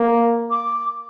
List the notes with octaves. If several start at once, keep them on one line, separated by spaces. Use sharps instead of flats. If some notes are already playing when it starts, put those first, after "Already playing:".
Already playing: A#3
D6